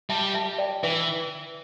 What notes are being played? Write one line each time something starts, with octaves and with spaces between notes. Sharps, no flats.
G3 E5 A5
E5 A5
D5 G5
E3 B4 E5